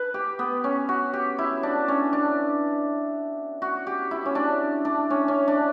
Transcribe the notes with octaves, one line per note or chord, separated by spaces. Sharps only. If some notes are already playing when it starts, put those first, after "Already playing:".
Already playing: B4
G4
B3
C#4
F#4
G4
E4
D4
C#4
D4
F#4
G4
E4
C#4
D4
D4
C#4
C#4
D4